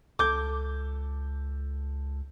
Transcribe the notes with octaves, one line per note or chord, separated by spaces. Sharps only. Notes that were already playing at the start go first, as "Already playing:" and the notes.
C#2 A4 D6 G6